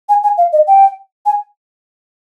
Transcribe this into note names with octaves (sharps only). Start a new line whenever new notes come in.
G#5
G#5
F5
D#5
G5
G#5